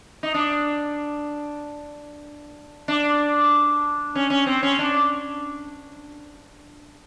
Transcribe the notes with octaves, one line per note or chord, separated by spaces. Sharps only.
D#4
D4
D4
C#4
C#4
C4
C#4
D4